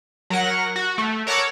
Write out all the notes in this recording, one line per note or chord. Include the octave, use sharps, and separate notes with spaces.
F#3 A#4 F#5 A#6
F#4
A3
A#4 C#5 F#5 A5 D6 E6